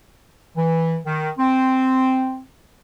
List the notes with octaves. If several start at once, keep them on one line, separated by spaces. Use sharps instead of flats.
E3
D#3
C4